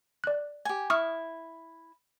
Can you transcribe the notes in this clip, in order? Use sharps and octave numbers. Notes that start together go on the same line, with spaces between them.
D5 F#6
G4 G#5
E4 C#6 D#6 F6